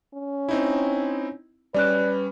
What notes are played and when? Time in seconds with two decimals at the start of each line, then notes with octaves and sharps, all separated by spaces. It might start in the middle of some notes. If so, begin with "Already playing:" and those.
0.14 C#4
0.49 C4 D#4 E4
1.74 G3 C#4 B4 D5 F#6